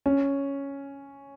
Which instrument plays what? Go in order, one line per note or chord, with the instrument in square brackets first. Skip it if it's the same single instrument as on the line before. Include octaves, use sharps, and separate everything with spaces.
[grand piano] C#4